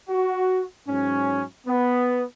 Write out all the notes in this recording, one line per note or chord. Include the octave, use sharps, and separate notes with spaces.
F#4
G#2 F#3 C#4
B3